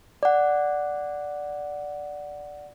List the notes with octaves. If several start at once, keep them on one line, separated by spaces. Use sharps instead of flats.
D5 F#5